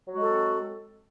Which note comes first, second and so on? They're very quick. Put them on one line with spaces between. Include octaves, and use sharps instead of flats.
F#3 F#4 G#3 A4 C4